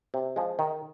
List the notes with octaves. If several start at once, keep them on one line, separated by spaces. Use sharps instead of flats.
C3
F3 G#3
D#3